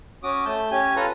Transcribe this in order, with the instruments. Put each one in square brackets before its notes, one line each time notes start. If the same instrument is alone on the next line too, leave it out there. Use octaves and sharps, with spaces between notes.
[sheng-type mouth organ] C#4 F#4 D6 D#6
A3 A5 G6
C#4 G4 G#5
F4 A4 B4 A#5